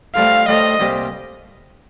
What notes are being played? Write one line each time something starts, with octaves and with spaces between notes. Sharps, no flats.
A2 G3 C4 F4 A4 F5
A2 G3 C4 F4 A4 D#5
C2 A#2 G3 C4 G4